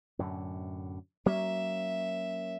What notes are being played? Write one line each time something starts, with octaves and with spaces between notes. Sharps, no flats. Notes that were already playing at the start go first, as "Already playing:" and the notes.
F#2 A2 D3
F#3 A#3 C#4 E5